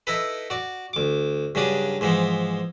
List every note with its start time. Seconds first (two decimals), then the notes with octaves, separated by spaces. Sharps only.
0.07 D#4 E4 A4 B4
0.50 F#4 D5
0.93 D2 D6
1.55 G2 C#3 F#3 D4 D5 D#6
2.01 G#2 E3 F3 B3